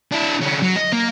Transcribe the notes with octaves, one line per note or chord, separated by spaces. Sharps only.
D4 E4
D3 C#4
F#3
D#5
A#3